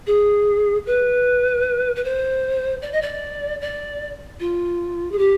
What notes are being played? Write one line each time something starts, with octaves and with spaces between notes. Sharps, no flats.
G#4
B4
B4
C5
D5
D#5
D5
D5
F4
G#4
G4